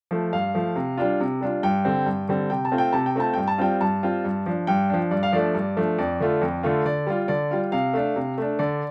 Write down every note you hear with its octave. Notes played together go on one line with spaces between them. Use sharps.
F3 A3
G2 F5
F3 A3
C3
G3 D4 F4
C3
G3 D4 F4
G2 G5
D3 G3 C4
G2
D3 G3 C4
C3 G5
A5
A3 C4 F4
G5
C3 A5
G5
A3 C4 F4 A5
G2 G5
A5
G3 C4 F4 G5
G2 A5
G3 C4 F4
G2
F3 D4
G2 G5
F3 D4
G2 D5
F5
F3 A3 D4 D5
G2
F3 A3 D4
F2 D5
D3 A3 F4
F2
D3 A3 F4
D3 D5
G3 F4
D3 D5
G3 F4
C3 F5
A3 D4
C3
A3 D4
D3 D5